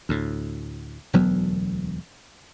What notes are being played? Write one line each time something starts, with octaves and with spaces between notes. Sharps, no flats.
D2 A2
E1 D2 F#3 B3